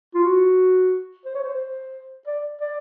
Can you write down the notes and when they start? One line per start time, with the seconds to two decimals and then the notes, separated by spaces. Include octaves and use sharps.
0.15 F4
0.24 F#4
1.25 C5
1.35 C#5
1.44 C5
2.27 D5
2.61 D5